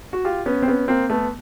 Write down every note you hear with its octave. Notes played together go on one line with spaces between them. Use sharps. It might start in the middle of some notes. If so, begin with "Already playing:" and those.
F#4
F4 G4
B3 C#4
C4
B3 C#4
A#3 C4
A3 B3